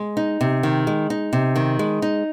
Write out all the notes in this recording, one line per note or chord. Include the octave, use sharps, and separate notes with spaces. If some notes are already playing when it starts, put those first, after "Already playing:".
Already playing: G#3
D#4
C3
D#3
G#3
D#4
C3
D#3
G#3
D#4